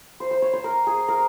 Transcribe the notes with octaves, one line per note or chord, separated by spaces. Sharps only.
C5
C5
C#5
C5
A#4
G#4
A#4